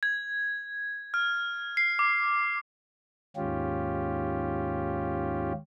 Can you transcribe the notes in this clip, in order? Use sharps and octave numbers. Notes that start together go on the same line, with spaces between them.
G#6
F6
C7
D6
D#2 G#2 C#4 F4 G4